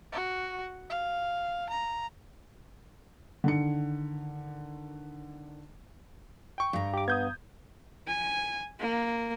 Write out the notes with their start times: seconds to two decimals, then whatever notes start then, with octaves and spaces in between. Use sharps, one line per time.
0.12 F#4
0.90 F5
1.70 A#5
3.44 D3 D#3 C#7
6.58 G5 C#6
6.73 G2 A#5
6.94 G4 D6
7.08 B3 D#6 G6 G#6
8.07 G#5
8.80 A#3